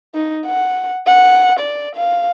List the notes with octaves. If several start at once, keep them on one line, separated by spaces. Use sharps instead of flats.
D#4
F#5
F#5
D5
F5